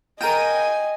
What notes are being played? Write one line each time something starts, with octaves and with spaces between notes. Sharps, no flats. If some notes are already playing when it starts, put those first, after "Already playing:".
F4 A#4 D#5 G5 G#5 A#6 D#7